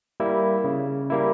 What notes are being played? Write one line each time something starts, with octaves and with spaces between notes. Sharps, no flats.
G3 A#3 E4
C#3
G3 A#3 E4